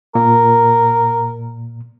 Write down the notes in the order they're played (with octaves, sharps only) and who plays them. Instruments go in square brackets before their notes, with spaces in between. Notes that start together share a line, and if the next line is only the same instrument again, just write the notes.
[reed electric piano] A#2 [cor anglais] A#4